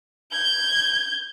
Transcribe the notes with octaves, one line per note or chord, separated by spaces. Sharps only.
G6 G#6